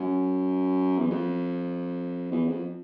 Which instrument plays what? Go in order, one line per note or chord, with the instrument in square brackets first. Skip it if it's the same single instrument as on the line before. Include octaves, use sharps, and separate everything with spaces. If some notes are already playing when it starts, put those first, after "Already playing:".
Already playing: [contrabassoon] F#2
E2
F2
E2
F2